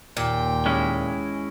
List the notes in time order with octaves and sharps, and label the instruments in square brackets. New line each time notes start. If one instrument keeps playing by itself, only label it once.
[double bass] D#2 [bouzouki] A#2 [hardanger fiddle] G5
[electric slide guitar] G#3 C#4 E4